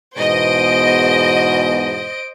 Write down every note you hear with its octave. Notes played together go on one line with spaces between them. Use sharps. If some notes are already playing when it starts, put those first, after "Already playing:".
E2 G#2 B2 C5 D#5 D7